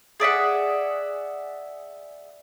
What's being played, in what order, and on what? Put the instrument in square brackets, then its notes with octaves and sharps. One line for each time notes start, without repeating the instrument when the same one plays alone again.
[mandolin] G#4 D5 E5 F#5